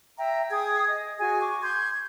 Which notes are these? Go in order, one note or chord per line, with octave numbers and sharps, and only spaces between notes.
E5 G5 A#5
G#4 G5 D#6 G#6
D#5
F#4 G#4 G#5
C#6 D6
C6 G6 G#6